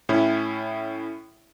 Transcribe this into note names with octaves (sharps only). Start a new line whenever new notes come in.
A2 C#4 E4